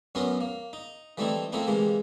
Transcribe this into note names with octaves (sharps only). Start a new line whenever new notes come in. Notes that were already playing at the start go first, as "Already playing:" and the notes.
F#2 B3 C#4 F#4 A#4 C6
A#3
D#4
E3 G3 A3 C4 D#4 E4
F3 A3 A#3 C4 D#4 E4
C3 E3 G#3 A#3